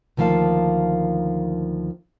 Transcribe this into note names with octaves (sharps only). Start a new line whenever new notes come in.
D2 D#3 F3 A#3 F5 A5